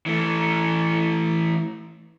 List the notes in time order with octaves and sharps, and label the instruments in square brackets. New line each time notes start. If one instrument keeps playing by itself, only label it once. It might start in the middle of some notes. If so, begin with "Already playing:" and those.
[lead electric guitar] E3 A3